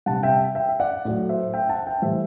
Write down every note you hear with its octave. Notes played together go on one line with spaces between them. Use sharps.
C3 G3 F#5 A5
E5 G5
E5 G5
E5
D5 F#5
A2 F#3
C5 E5
E5 G5
F#5 A5
E5 G5
A2 E3 G3 C5 E5